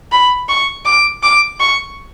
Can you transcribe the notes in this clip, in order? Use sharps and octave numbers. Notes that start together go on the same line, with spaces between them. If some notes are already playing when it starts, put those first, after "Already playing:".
B5
C#6
D6
D6
C#6